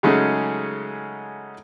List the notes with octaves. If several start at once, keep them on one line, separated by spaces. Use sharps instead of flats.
C#3 F#3 G#3 A3 C#4 D#4